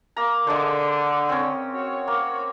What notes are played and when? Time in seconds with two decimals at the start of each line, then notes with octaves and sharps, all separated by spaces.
0.16 A#3 A#5
0.47 D3 G#3 D4 C5
1.29 C4 C#4
1.73 F#4 C#5
2.08 A#3